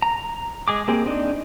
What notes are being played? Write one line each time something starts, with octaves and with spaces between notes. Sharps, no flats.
A#5
G#3 G#4 D6
A#3 C4 G4 G#4
C4 D4 D#4